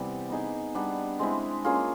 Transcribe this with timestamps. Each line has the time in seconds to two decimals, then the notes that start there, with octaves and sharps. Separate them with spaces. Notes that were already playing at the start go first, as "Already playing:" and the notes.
Already playing: C3 E3 G3 B3
0.30 B3 D#4 G#4
0.75 G3 B3 D4
1.19 G#3 C4 E4
1.64 A#3 C#4 F4 G#4